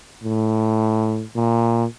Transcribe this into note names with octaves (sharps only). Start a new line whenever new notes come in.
A2
A#2